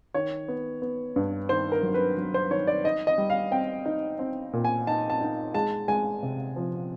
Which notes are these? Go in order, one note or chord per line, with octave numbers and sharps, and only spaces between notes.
D#3 C#5
B3
B3
G2
D#3 C5
A#4
F#3
B4
F#3
C5
D#3 C#5
D5
D#4 D#5
D#5
G3
F5
C4 G5
D#4
C4
A#2
G#5
D#4 A5
A5
D#4
G#3 A5
G#3 G#5
C3
F3